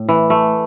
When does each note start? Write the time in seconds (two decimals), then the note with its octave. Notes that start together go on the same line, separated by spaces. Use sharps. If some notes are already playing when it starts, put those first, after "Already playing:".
Already playing: A2
0.09 E3
0.30 A3